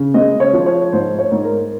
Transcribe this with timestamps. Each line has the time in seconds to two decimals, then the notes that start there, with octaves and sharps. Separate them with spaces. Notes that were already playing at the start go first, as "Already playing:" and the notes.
Already playing: C#3
0.14 G#3 D#5
0.40 C#5
0.53 F3
0.66 C#5
0.92 G#2 C5
1.19 C#5
1.31 G#2
1.44 A#4